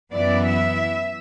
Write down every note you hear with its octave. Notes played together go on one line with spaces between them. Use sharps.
F#2 E3 B3 E4 D5
E5